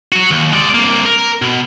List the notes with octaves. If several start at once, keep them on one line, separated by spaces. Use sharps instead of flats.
F#3 F#4
D#2
G#3 D5
C2 A#3
A#4
B2